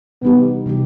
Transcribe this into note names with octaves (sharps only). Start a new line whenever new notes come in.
C3 E3 G3 B3 D#4 G4
C3 E3 G3 D#4 G4